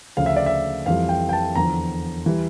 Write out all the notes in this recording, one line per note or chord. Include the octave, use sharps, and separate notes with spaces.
D2 C#3 F3 F5
E5
D5
E5
F2 E3 G3 F5
G5
G5
A5
E2 D3 F3 A#5
E3 G3